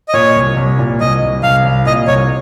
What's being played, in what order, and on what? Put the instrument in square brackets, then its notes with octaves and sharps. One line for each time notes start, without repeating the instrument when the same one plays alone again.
[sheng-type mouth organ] D#5
[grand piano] A#2 [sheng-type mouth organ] C#5
[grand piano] C2
C2
A#2
[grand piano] C2 [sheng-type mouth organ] D#5
[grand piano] C2
[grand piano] C2 [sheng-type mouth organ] F5
[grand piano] C2
[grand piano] A#2 [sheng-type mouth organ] D#5
[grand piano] C2 [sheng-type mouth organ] C#5